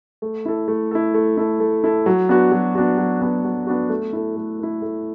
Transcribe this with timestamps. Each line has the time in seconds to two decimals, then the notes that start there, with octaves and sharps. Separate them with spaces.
0.22 A3
0.45 E4 A4
0.68 A3
0.91 E4 A4
1.14 A3
1.37 E4 A4
1.60 A3
1.84 E4 A4
2.06 F#3
2.29 B3 D4 F#4
2.52 F#3
2.75 B3 D4 F#4
2.98 F#3
3.22 B3 D4 F#4
3.44 F#3
3.67 B3 D4 F#4
3.89 A3
4.13 E4 A4
4.36 A3
4.59 E4 A4
4.82 A3